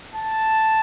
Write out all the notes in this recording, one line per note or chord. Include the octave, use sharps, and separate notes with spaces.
A5